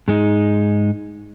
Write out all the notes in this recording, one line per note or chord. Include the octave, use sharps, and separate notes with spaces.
G#2 G#3 D#4